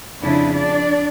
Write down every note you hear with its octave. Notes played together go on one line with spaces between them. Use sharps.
F2 C#3 D4 E4
D4 D5